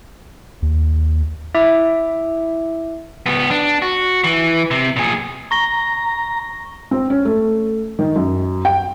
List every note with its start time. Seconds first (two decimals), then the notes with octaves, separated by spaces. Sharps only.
0.62 D#2
1.55 E4 E5 D6
3.26 C#2 B3
3.51 D4
3.82 F#4
4.24 E3
4.71 C3
4.96 A#2 G#4
5.51 A#5 C#6 A#6 G7
6.91 C4
7.10 C#4
7.25 A3
7.99 D#3
8.16 F#2
8.65 G5